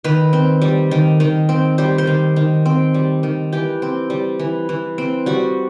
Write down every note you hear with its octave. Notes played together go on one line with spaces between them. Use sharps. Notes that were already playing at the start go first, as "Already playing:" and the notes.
D#3 B4
C4
G3
D#3
D#3
C4
G3 C5
C5
D#3
D#3
C4
G3
D#3
E3 G4
C4
G3
E3
E3
C4
G3 F#4